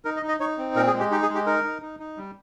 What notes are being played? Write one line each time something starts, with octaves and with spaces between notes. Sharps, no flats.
D#4 A#4
D#5
D#4
D#5
D#4 C#5
C4
A#2 A#4
G#4
G#3
G4
D#4 G4
G#4
G#3
G4
D#4 A#4
D#4
D#4
D#4
G3